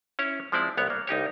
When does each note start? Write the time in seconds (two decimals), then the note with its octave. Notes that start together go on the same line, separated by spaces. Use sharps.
0.19 C#4 E4 C#5
0.52 F3 G#3 C4 E4 D5
0.77 C2 B3 C#5
0.90 A#3
1.07 C2 D#4 G4 C#5